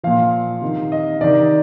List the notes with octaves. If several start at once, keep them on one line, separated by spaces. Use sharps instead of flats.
A#2 F3 F5
C3 D#3
D#5
C3 D#3 D5